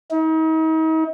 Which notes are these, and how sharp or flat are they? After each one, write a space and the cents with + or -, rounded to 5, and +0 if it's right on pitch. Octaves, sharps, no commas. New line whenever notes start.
D#4 +40